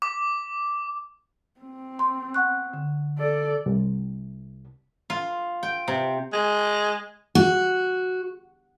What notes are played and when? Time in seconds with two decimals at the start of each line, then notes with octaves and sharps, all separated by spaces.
0.02 D6
1.60 C4
1.99 C6
2.34 F#5 C#6 F#6
2.74 D3
3.18 A4 D5
3.66 C2
5.10 F4
5.63 G5
5.88 C3
6.33 G#3
7.35 F#4